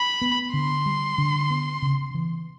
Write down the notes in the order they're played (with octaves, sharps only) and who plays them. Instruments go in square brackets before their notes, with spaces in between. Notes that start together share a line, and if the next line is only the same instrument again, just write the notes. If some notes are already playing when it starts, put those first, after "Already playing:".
Already playing: [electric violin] B5
[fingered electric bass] B3
[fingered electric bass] D3 [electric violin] C6
[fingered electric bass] G3
D3
B3
C#3
E3